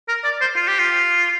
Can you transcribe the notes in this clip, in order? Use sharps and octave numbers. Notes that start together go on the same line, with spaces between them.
A#4
D5
C5
F4
G4
F4